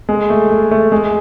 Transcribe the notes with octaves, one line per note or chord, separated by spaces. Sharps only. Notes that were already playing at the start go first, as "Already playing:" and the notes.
G#3
A3
A3
A3
G#3